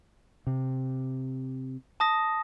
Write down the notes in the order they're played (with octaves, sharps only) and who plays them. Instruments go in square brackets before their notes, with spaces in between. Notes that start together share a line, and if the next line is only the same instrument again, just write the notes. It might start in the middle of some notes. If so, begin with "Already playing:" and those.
[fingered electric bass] C3
[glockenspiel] A5 D#6 A#6